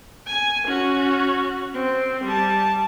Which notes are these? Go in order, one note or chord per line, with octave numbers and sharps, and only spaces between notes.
G#5
C#4 F#4
C4
G3 A5